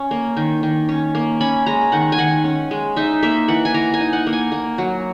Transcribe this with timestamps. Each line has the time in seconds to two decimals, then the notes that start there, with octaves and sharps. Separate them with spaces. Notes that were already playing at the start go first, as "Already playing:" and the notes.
Already playing: C#4
0.11 A#3
0.37 D#3
0.63 D#3
0.89 C#4
1.15 A#3
1.41 C#4 B5
1.66 G#3 A#5
1.92 D#3 F#5
2.12 G#5
2.19 D#3 F#5
2.44 C#4
2.71 G#3
2.96 D#4 E5
3.23 A#3 E5
3.48 E3 F#5
3.65 G#5
3.74 E3 A#5
3.94 G#5
4.00 D#4
4.13 F#5
4.27 A#3
4.33 G#5
4.52 A#3
4.78 F#3